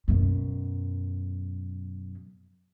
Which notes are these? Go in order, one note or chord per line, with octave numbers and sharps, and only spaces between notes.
F#2 B2